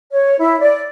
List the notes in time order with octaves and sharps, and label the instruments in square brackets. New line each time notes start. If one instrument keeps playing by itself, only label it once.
[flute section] C#5
E4
D5